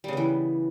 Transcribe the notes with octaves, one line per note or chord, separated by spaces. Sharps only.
C#3 E3 G3 B3